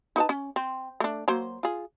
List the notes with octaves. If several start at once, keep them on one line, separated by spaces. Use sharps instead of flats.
D#4 B4 A5
C#4
C4
A3 D4
F#3 A#3 C5
F4 G#4